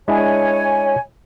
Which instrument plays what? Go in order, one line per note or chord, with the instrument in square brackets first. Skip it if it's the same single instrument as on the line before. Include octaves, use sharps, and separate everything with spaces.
[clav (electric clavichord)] G#3 D4 E4 [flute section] C#5 G#5